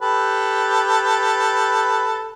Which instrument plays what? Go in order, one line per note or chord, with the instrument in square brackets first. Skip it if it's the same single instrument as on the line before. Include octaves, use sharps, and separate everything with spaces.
[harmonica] G4 A4 B4